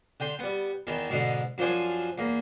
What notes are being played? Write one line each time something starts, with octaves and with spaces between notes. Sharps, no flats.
D3 G5 C6
G3 B3
E2 D#3 E3
G#2 B2 D3
F#2 F3 D4 C5 G#5
E2 A#3